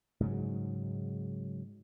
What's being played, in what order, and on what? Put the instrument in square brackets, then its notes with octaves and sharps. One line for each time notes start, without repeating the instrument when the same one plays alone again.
[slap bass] G#2 C#3 F#3